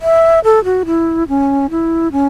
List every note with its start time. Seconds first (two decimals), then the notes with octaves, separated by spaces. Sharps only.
0.02 E5
0.44 A4
0.64 F#4
0.86 E4
1.29 C#4
1.70 E4
2.12 C#4